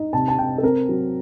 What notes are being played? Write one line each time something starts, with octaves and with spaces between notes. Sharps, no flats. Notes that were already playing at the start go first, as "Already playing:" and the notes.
Already playing: D#4
C3 A5
A5
C3 G5
A4
C4 A#4
F#3